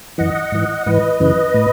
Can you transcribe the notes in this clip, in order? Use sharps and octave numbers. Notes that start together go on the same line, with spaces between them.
F#2 E3 D#5 F#5
G#2 E3
G#2 E3 B4 D#5
F#2 C#3 E3
A2